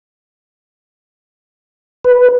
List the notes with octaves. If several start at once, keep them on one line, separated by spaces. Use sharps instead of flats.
B4